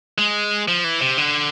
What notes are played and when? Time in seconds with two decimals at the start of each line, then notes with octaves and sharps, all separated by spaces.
0.18 G#3
0.68 F3
0.84 E3
1.01 C3
1.18 D3